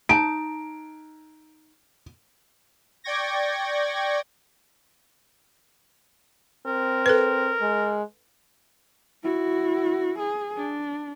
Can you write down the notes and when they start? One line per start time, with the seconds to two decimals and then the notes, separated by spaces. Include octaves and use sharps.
0.09 D#4 A5 D7
3.04 D5 G5 C#6 G#6 A#6
6.66 C4 A#4
7.06 A4 B4
7.61 G#3
9.23 E4 F#4
10.19 G#4
10.57 D4